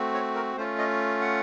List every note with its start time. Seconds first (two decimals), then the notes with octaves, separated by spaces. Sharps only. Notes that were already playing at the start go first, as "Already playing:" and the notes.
Already playing: A3 C4 F#4
0.14 C#5
0.35 A#4
0.56 A3 C#4 F4 C5
0.78 D#5
1.21 F#5